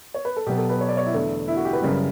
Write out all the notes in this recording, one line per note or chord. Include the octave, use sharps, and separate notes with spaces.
C#5
B4
A4
B2 F#3 B3 G4
A4
B4
C#5
D5
C#5
E4
E2 D3 A3
E4
F#4
G4
B4
F#2 C#3 G3